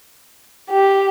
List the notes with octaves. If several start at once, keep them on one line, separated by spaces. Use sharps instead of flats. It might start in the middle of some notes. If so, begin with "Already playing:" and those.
G4